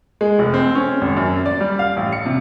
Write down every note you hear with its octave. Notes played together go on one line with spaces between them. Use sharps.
G#3
F1
C4
C#4
G#1
F#2
D5
G3
F5
A1
C#7
C3